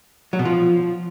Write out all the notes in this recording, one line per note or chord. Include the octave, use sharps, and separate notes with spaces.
F#3
B2
F3